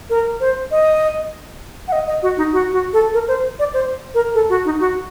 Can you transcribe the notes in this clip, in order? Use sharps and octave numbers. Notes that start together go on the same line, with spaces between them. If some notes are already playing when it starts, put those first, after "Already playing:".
A#4
C5
D#5
F#5
D#5
D#5
F#4
D#4
F#4
F#4
A4
A#4
C5
D5
C5
A#4
A4
F#4
D#4
F#4